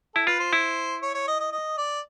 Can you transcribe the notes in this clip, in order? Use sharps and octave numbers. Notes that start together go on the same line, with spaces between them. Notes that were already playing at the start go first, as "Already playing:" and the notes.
E4 A4
F4 B4
C5
E4
C#5
C#5
D#5
D#5
D#5
D5